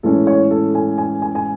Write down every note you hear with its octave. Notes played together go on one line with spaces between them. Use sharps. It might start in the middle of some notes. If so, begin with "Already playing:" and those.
A2 E3 G#3 C#4 A4
C#5
A4
G#5
G#5
G#5
G#5